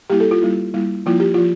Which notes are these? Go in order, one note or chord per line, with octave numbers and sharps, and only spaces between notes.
G3 A#3 E4 G4
A4
F4
G3 A#3 E4
G3 A#3 E4
F3 A#3 E4 F4
G4
F3 F4